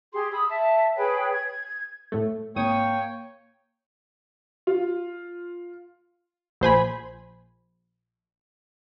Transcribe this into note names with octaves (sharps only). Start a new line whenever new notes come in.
G4 G#4 C6
B5 D#6 E6
E5 A5
G#4 B4 C#5 G5
G#6
A2 A3
G#1 A#3 C#5 G5 C#6 D#6 D#7
F4
A#1 C5 G#5 B5